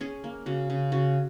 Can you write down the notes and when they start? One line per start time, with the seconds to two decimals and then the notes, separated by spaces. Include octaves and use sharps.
0.01 C#4 G#4
0.24 A#3
0.46 C#3 F#4
0.70 C#3
0.92 C#3 F#4